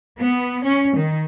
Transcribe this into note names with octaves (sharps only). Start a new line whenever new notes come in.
B3
C#4
D#3